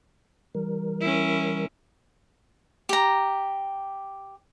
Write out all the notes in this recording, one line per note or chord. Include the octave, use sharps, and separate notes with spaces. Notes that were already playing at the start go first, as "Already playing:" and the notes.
E3 G3 A#4
C#4 E4
G4 A#5